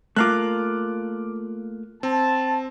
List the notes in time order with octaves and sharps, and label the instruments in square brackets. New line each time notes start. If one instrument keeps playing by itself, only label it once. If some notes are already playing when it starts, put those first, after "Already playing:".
[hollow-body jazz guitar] A3 A#3 F4 [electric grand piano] D6 F6 F#6
[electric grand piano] C4 [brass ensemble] A5